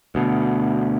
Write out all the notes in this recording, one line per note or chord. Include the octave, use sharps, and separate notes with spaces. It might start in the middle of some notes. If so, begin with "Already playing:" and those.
D2 B2